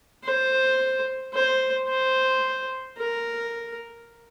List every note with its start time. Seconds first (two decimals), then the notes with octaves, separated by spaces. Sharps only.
0.24 C5
1.34 C5
1.88 C5
2.98 A#4